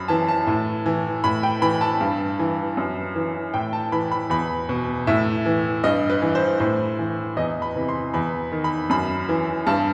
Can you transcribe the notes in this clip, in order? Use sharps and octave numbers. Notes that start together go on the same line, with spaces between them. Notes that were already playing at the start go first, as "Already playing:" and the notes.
Already playing: F#2 B5
E3 A5
A5
A2
E3
A2 B5
G5
E3 B5
A5
G2
E3
F#2
E3
A2 G5
A5
E3 B5
B5
E2 B5
B2
A2 E5
E3
G2 D#5
B4
E3
C5
A2 C5
E3
E2 D#5
B5
C3 E3
C6
E2 B5
D#3
B5
F#2 B5
E3
G2 A5